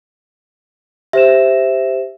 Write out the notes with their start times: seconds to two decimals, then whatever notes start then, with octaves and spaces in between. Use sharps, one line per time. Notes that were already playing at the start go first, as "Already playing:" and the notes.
1.13 G4 C5 E5 E7